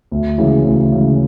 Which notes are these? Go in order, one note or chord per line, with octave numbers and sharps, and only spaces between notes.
D2
C#3 E3 G#3
D2
C#3 E3 G#3